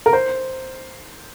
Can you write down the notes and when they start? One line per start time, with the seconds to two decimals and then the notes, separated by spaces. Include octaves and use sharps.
0.06 A#4
0.13 C5